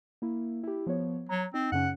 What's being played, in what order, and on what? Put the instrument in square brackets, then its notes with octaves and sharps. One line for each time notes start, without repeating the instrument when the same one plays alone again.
[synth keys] A#3 E4
E4 G4
F3 B3 C#5
[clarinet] F#3 [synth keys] A#5
[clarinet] C4 [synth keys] D#4
[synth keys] F#2 C#3 C#4 [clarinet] F#5